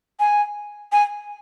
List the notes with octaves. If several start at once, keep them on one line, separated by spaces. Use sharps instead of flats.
G#5
G#5